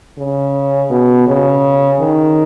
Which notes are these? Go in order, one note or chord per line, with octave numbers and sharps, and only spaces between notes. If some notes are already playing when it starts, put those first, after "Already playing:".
C#3
B2
C#3
D#3